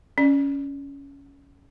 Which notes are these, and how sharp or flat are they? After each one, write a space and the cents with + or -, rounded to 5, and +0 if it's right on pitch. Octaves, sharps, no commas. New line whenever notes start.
C#4 +10 D5 +25